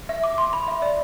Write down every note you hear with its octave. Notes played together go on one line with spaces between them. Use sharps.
E5
D6
C6
B5
E5
D5